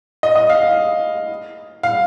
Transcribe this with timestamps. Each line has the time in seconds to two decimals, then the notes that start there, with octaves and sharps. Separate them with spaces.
0.23 D#5
0.36 D#5
0.50 F5
1.83 F5